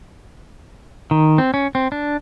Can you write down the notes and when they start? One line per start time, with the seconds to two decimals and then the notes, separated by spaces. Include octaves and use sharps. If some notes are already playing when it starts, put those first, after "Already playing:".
1.11 D#3
1.38 C4
1.54 C#4
1.75 C4
1.92 D4